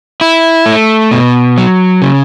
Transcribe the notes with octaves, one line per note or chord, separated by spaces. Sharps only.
E4
A3
B2
F#3
C#3